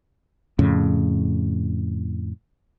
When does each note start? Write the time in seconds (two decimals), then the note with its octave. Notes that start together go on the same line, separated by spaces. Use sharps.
0.59 F2 A2 C#3